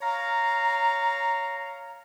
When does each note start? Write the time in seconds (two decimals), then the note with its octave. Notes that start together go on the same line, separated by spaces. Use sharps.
0.01 C#5 F5 A#5